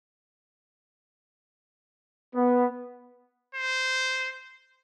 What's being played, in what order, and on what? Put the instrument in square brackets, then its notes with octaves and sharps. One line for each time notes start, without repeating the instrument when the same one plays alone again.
[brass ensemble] B3
[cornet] C5